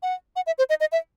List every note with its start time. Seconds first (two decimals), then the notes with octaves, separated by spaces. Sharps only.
0.03 F#5
0.36 F#5
0.47 E5
0.58 C5
0.70 D#5
0.80 D#5
0.92 E5